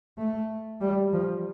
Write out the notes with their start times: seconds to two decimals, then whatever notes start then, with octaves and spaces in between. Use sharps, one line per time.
0.18 A3
0.81 G3
1.13 F3